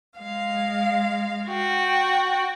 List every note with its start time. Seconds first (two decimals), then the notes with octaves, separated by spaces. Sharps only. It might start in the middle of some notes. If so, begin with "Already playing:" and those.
0.18 G#3 F5
1.48 F#4 G5